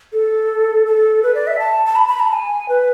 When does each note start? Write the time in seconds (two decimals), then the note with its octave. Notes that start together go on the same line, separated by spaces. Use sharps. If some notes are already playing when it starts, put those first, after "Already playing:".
0.13 A4
0.86 A4
1.23 B4
1.35 D5
1.47 E5
1.59 A5
1.86 A5
1.96 B5
2.08 B5
2.20 A5
2.32 G#5
2.69 B4